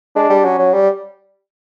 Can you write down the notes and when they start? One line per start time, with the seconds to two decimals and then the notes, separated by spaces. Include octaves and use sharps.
0.16 G#3 D4
0.30 G3
0.44 F#3 C#4
0.59 F#3
0.73 G3